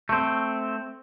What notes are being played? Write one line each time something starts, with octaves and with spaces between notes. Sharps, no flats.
A3 C4